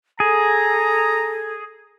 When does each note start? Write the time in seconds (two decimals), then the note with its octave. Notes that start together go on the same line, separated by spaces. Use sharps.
0.20 G#4 A4 A#5